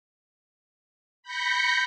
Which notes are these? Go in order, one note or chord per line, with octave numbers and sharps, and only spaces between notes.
B5 G6 A#6 B6 C#7